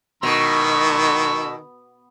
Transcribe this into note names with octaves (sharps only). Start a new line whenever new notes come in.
B2 D#3 B5 C#6 E6